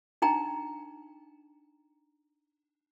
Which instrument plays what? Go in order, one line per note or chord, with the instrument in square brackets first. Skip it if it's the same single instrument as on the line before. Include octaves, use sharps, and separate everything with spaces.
[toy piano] D4 D#4 G5 A#5